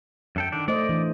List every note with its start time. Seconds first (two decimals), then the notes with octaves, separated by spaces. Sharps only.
0.36 F#2 A4 G5
0.52 D3 D#3 D4
0.68 A3 C5 D5 D#5
0.89 E3 D4 A4